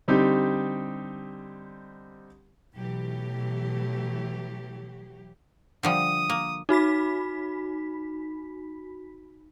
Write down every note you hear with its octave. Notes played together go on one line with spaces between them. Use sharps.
D3 G3 C4 D#4 G4
B2 E3 F#3 A3 G4
D3 F3 G3 D#6
A#3
D#4 F#4 B5 B6